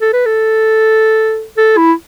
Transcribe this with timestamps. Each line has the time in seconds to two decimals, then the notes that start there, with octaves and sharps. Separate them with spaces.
0.01 A4
0.13 B4
0.26 A4
1.57 A4
1.77 E4